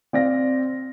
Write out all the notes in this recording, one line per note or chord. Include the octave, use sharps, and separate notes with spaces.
C4 D5 F5 A#6